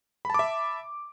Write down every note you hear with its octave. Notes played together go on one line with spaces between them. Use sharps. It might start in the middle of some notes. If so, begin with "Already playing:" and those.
E5 A5 B5 D6